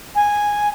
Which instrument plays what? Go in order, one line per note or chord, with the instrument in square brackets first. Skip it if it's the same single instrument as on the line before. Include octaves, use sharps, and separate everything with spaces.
[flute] G#5